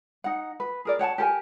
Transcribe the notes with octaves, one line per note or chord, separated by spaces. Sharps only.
D#4 F#5
B4
G#4 A#4 D5
C#5 F#5 G5 A5
G4 A4 A#4 G#5